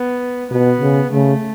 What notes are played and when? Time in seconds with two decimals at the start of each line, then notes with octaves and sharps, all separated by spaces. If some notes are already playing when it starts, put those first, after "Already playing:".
Already playing: B3
0.51 B2 B3
0.81 C#3
1.12 C#3 A3